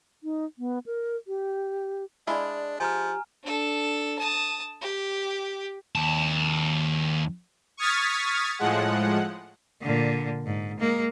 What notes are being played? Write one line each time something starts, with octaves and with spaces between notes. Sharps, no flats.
D#4
B3
A#4
G4
G#3 D4 E4 D5 F5
F3 G4 G#5 A#5 F6
D4 A4
A5 D#6
G4
D#2 A5
C#6 D#6 F6 G#6 A6 B6
A2 F3 G#3 F#5
A#2 D3
G#2
G#3 A#3